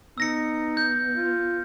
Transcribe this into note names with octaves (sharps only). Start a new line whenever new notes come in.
B3 D#4 E6 A#6 C#7
G6
F4